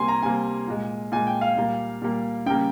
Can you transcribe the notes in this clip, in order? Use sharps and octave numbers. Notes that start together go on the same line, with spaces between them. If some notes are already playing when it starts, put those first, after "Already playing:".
Already playing: C3 G3 A#3 G#5 C6
A#5
C3 G3 A#3 G#5
A#2 G#3
A#2 G#3 G#5
G5
F5
A#2 G3 A#3
A#2 G3 A#3
C#3 G3 A#3 G5